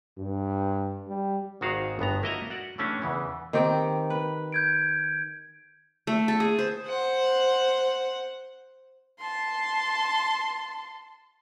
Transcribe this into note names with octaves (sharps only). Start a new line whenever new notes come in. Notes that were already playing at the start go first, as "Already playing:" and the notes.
G2
G3
G#1 G#2 D#3 F#4 G#4 F5
G1 G2 B3 A#5
A#3 E4 F#4 D#5 E5 A#5
F#4 D5 F#5
E3 A3 C#4 D4 G4
E2 C#3 E3
D#3 C4 G4
B4
G6 G#6 D7
A3
A4
G#4
C5
C5 F#5
A5 C6